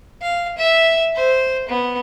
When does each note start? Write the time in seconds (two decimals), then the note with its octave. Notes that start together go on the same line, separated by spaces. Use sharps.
0.22 F5
0.58 E5
1.15 C5
1.69 B3